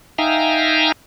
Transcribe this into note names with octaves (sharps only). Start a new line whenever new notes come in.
D#4 E5 F5 G5 G#5 A#5